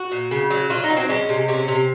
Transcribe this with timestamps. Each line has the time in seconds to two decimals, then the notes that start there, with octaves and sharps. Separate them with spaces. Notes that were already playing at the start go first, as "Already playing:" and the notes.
Already playing: F#4
0.12 A#2
0.31 C#3
0.50 F#3
0.70 F#3 F4
0.84 D#4
0.90 F#3
0.97 C4
1.09 G#3 C#4
1.29 C3
1.48 C3 C#4
1.68 C3